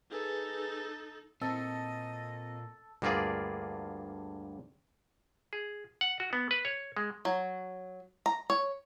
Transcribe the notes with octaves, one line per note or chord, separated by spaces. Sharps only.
D#4 G#4 A4 B4 G#5
A#2 C4 A4 D#5
D2 G2 A#3 F4 G#4 D5
G#4
F#5
F#4
B3
B4
C#5
G#3
F#3
A#5
C#5